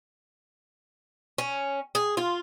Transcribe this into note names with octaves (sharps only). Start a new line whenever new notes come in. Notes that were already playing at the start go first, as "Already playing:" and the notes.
C#4
G#4
F4